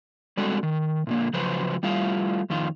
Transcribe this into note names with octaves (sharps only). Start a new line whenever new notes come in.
G3 G#3 C4 D4 F#4 A4
D#3
A#2 D3 A#3
C#3 F3 F#3 F#4 B4 C5
G3 A3 E4 F4 F5
F2 D#3 F4